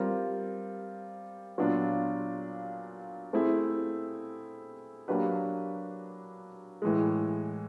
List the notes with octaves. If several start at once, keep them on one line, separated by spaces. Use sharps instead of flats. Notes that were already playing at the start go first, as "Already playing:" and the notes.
Already playing: G3 C4 F4 A#4
A#2 F#3 B3 D4 F4
A3 C4 E4 G#4
F#3 A#3 D4 G4 B4
A2 E3 G#3